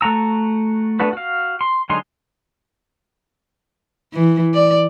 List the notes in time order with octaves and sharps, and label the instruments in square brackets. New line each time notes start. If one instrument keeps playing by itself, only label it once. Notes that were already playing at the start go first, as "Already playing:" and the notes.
[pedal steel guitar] A3 F#4 A#5 E6
A3 B3 D4 F#4 B4
F#4 F5
C6
D3 F#3 G#3 D#4 C6
[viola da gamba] E3
D5